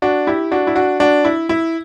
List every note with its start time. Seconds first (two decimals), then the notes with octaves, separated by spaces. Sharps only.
0.02 D4 F#4
0.27 E4 G4
0.52 D4 F#4
0.67 E4
0.75 D4 F#4
1.00 D4 F#4
1.24 E4
1.49 E4